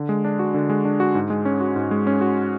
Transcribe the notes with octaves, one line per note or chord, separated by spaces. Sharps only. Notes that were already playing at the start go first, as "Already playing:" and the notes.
Already playing: D3
G#3
D4
F#4
D3
G#3
D4
F#4
G#2
G#3
C#4
F#4
G#2
G#3
C#4
F#4